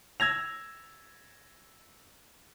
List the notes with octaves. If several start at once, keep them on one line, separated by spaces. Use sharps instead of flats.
E6 G#6 A#6 F7